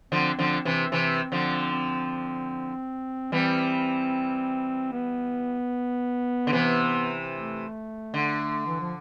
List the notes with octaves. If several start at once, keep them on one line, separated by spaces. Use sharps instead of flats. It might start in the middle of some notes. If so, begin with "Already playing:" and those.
D3 F3 C4
D3 F3
C3 E3
C3 E3
D3 F3
C4
E3 G3 C4
B3
D3
C3 E3
A3
D3
E3
F3